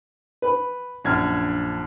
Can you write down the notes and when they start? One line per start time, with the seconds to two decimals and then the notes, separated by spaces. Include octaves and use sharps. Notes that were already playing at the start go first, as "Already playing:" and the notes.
0.42 B4 B5
1.05 A#1 F#2 D4 F6 G#6